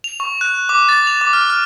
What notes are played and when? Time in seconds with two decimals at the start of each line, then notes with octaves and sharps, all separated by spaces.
0.04 F7
0.20 C#6
0.41 F#6
0.69 D6
0.89 A6
1.07 F7
1.21 D6
1.33 F6
1.50 F6